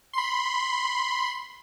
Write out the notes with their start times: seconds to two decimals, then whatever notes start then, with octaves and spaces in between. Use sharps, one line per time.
0.13 B5 C6